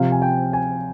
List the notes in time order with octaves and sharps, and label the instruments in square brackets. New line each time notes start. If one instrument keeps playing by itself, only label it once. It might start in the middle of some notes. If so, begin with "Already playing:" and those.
Already playing: [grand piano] C3 F3 F5
G#5
G5
G#5